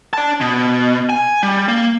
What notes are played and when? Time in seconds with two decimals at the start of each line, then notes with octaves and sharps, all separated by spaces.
0.14 D5 A5
0.41 B2
1.10 G#5
1.43 G3
1.68 A#3